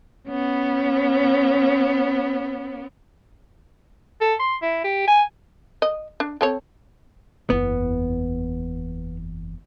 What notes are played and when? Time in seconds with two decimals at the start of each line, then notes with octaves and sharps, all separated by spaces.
0.28 B3 C#4
4.21 A4
4.39 C6
4.62 E4
4.84 G4
5.07 G#5
5.82 D#5
6.20 D4
6.41 C4 A4 C#5
7.50 F#1 E2 B3